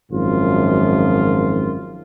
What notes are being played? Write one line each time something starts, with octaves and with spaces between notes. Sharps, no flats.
G#1 F#2 F3 F4